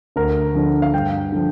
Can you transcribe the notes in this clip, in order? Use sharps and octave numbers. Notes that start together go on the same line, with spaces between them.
D2 A#4
D3 F3
F5
G2 G5
D3 F3